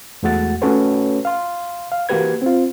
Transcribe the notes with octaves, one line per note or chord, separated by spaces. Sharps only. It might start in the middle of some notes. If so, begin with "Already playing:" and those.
E2 G#3 A3 F#4 F#5 A6
A3 C#4 F#4 A4 B4 C#5
F5 C6
F5
E3 A#3 F#4 G4 B4 G#6
C4 F4